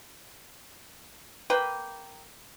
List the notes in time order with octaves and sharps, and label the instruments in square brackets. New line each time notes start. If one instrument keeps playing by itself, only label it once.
[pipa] A#3 B4 G5